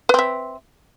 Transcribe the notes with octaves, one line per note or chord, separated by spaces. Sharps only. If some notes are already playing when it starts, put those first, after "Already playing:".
C4 B4 E5